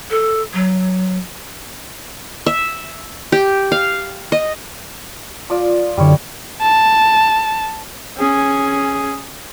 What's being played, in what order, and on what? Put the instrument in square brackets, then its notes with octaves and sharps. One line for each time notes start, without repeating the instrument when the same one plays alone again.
[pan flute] A4
F#3
[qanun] E5
G4
F5
D#5
[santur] F3 D5
[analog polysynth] F#2 D3 [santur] G3 E4 C#5
[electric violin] A5
[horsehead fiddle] C#4 G#4